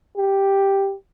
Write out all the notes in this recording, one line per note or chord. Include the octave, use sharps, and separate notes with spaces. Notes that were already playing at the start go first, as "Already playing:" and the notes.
G4